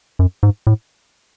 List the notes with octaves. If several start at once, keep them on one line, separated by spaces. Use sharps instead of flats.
F#2
G#2
A2